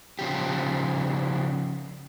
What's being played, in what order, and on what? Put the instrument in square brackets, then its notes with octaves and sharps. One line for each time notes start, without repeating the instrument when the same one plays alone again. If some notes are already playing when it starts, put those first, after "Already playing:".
[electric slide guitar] C#3 F3 G4